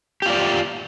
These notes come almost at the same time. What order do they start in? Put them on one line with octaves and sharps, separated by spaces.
G4 F4 D5